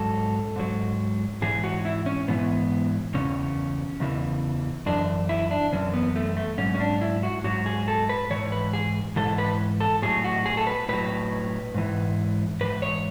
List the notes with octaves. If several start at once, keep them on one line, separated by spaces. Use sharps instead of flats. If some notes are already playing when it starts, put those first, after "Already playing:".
Already playing: G#2 F#3 A4
G#2 F#3
G#2 E3 G#4
F#4
E4
C#4
G#2 E3 B3
E2 C#3 C#4
E2 C#3 E3
F#2 E3 D4
E4
D4
F#2 E3 C#4
B3
A3
A3
G#2 F#3 C#4
C#4
D4
E4
F#4
G#2 F#3 F#4
G#4
A4
B4
G#2 E3 C#5
B4
G#4
G#2 E3 A4
B4
A4
A2 F#3 G#4
F#4
G#4
A4
B4
A2 F#3 B4
G#2 E3
G#2 E3 B4
C#5